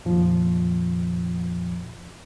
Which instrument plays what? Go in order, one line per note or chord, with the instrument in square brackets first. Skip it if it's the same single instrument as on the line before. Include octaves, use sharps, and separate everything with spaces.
[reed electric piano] F2 A#2 D#3 F3